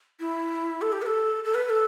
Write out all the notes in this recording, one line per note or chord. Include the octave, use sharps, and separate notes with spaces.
E4
A4
G4
B4
A4
A4
B4
B4
A4